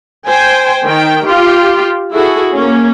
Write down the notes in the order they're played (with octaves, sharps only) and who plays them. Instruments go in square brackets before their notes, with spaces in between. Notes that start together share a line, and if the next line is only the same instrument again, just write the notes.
[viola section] C5 G5 G#5
D#3 G5
F4 G4
E4 F#4 G#4 A4
A#3 C#4